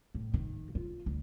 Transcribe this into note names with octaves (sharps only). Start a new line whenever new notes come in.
A2
D#3
F4
D2